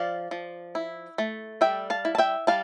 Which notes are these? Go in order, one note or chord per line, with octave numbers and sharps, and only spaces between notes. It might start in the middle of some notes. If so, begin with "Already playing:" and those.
Already playing: F3 D5 F5
F3
E4
A3
G3 E5 G5
F5 A5
E4
A5
E5 G5
G3 F5 A5